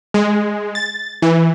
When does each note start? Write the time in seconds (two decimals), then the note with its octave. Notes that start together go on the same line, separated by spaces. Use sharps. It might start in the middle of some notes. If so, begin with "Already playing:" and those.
0.14 G#3
0.75 A6
1.22 E3